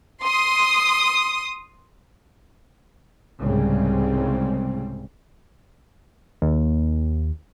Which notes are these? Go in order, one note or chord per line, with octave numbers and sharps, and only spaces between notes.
C6 D#6
C2 G#2 C#3 G3 C4
D#2